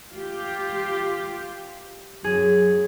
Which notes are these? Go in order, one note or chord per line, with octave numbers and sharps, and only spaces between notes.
F4 G4
F#2 G#4